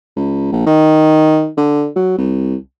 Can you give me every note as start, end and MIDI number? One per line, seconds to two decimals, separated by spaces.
0.16 0.49 37
0.52 0.65 34
0.66 1.49 51
1.57 1.89 50
1.96 2.14 54
2.18 2.55 36